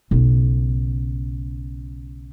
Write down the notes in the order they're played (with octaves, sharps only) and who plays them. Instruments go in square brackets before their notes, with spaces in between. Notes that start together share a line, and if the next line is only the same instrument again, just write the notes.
[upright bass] B1 C#3